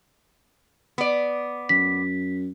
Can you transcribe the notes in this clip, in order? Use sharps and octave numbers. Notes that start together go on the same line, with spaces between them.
B3 D5
F#2 B6